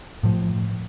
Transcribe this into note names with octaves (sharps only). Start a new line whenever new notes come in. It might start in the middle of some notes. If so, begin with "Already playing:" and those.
A2 F3